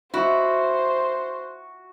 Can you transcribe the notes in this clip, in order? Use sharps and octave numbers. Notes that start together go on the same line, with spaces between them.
E4 F#4 C5